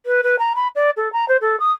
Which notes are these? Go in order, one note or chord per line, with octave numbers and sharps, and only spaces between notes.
B4
B4
A#5
B5
D5
A4
A#5
C5
A4
D#6